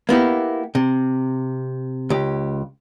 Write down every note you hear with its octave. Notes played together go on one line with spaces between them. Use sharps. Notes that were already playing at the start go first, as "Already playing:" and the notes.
A#3 B3 E4 G4
C3
C#2 G4